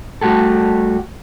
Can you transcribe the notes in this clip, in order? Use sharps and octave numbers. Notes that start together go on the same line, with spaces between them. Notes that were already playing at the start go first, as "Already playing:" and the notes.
G3 A3 F#4 G4 A4